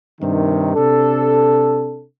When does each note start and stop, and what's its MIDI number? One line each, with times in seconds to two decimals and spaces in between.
0.20 0.75 43
0.20 0.75 48
0.20 0.75 51
0.75 2.03 48
0.75 2.03 62
0.75 2.03 69